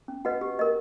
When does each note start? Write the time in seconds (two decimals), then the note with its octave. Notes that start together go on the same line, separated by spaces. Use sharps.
0.08 C#4
0.25 F#4 B4 D#5 F#5
0.41 G4
0.59 A#4 D#5